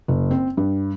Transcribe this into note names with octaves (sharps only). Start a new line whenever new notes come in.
F#1
C4
G2